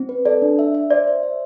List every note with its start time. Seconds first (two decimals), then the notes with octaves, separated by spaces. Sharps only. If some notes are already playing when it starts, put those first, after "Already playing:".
Already playing: C4
0.09 B4
0.25 A4 D5
0.42 D4
0.59 E5
0.74 E5
0.90 C5 D5
1.07 C5
1.23 E5